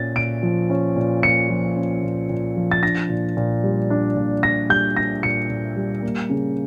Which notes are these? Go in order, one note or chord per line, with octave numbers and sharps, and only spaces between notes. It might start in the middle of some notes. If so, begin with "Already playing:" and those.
Already playing: A#2 C#4 A6
A#2 D7
F3
C#4
A#2
A#2 C#7
F3
C#4
A#2
A#2
F3
A6
D4 A#6
A#2
A#2
G3
D4
A#2
A#2 A#6
G3 G6
D4 A#6
A#2 C#7
A#2
G3
A#3
C#3